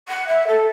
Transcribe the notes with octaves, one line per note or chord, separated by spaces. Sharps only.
F#5
E5
A4